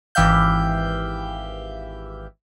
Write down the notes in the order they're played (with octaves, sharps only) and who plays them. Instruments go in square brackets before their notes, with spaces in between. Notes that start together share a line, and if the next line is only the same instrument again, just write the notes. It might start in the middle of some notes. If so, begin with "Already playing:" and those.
[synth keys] G#1 E3 G4 E5 F5 G6